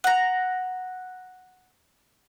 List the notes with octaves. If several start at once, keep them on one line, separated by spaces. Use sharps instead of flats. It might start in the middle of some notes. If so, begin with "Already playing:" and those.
F#5 A#5